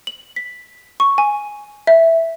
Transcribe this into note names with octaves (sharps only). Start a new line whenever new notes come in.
F#7
B6
C#6
G#5
E5